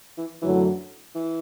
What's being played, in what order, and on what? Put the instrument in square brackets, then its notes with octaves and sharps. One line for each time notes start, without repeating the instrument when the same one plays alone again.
[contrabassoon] E3
[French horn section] F#2 D3 F#3 A3 [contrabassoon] E3
[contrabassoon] E3